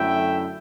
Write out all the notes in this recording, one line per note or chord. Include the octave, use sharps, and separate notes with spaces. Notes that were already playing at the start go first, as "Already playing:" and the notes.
Already playing: F#2 D3 A3 E4 E5 G5